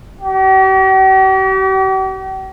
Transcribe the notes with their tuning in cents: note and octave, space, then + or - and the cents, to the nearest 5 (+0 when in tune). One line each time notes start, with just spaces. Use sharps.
G4 -45